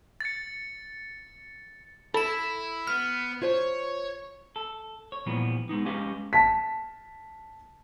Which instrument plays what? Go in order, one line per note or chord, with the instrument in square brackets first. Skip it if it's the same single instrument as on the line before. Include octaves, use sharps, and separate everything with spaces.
[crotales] A6 C#7
[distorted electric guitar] E4 [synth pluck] A4 E7 [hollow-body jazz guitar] B5
[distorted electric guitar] B3 [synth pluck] F6
[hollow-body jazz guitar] F4 C5 [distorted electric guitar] C#5
[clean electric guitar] A4
C#5
A#2 E3 F3 G3 B3
G#3 B3 D#4
G#3 C#4 G4 B4 D#5 F5
[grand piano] A5 B6